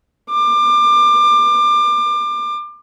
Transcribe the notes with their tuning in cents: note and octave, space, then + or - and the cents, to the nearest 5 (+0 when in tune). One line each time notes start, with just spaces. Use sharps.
D6 +25